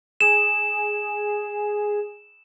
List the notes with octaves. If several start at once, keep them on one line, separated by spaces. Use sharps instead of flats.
G#4 E7